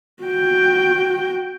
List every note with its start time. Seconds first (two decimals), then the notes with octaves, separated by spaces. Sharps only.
0.23 F#4 G5